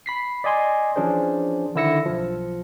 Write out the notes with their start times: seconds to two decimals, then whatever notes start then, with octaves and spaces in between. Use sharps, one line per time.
0.06 B5 B6 C7
0.44 D5 D#5 G#5 C6
0.96 E3 F3 C#4 D4 G#4 C5
1.75 D3 D#3 E4 E6 A#6 C#7
2.05 B1 F3